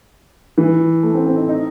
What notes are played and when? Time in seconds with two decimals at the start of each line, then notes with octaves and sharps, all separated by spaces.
0.58 E3
1.03 A3
1.14 C4
1.26 C4
1.37 D#4
1.49 D#4